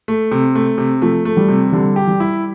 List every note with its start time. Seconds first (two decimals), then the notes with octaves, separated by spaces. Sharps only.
0.08 A3
0.31 C3
0.55 A3
0.78 C3
1.02 F3 A3
1.25 A3
1.37 G3
1.48 C3
1.72 D3 G3
1.96 G4
2.07 G3
2.20 E4